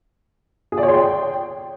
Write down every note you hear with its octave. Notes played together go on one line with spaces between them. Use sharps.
G#4
D5
C#5
C6
G5